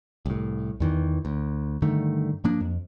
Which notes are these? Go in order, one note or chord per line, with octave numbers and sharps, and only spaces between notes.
C2 A2
E2 D#3 E3
D2
G2 D3 D#3 A3
G2 F3 A#3 D4
F2